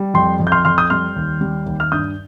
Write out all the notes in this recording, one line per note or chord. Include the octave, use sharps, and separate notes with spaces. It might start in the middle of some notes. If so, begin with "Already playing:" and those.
Already playing: G3
F2 G5 C6
F2
G6
C6 F6
F2 C6 F6
D#6 G6
G3 C6 F6
D#2
G3
D#2
F6
G2 D#6 G6